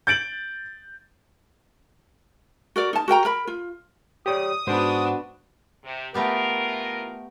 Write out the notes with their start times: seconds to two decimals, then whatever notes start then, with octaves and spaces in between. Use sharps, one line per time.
0.07 G6 A6 D7 F#7
2.76 F#4 A#4 D5
2.93 D#4 A5
3.08 F#4 A#4 G5 A#5
3.25 A#4 B5
3.47 F4
4.26 G4 C#5 D5 D#6
4.67 G#2 B3 D4 F#4 C5
5.84 C3
6.14 E3 A3 B3 F4 G4 A#4